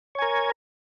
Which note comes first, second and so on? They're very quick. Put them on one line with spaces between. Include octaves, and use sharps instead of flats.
C#5 G#5 A#4